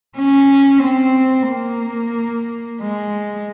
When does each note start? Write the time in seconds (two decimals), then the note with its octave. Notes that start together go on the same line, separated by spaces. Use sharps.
0.18 C#4
0.83 C4
1.49 A#3
2.81 G#3